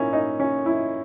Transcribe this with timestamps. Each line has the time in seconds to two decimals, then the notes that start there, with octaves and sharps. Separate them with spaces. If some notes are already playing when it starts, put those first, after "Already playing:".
Already playing: A#2 A#3 C#4 D#4 E4
0.13 D#4
0.40 C#4
0.66 E4